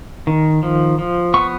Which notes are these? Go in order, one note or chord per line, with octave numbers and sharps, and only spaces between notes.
D#3
F3
F3
B3 C#6